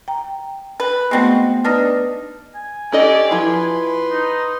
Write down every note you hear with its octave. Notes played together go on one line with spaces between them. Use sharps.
G5 A#5
B4
G#3 A3 B3 C4 F#4
D4 D#4 B4 F6 A#6
G#5
C#4 G4 A4 D5 D#5
F3 E4 B4 C6
D#4